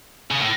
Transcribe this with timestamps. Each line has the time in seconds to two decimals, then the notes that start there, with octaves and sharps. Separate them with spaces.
0.31 C#3
0.41 A2